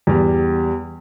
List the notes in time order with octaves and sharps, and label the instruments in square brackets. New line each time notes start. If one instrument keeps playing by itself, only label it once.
[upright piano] E2 G3